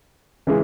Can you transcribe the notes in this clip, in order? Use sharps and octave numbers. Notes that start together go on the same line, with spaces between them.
C#3 E3 G#3